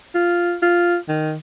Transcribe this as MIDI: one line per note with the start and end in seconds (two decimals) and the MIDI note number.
0.15 0.55 65
0.62 0.97 65
1.09 1.34 51